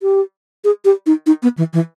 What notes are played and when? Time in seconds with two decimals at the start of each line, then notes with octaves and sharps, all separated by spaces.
0.03 G4
0.64 G#4
0.85 G4
1.06 D#4
1.26 D#4
1.43 B3
1.58 E3
1.73 E3